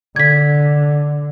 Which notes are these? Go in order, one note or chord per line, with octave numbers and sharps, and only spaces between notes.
D3 G#6 B6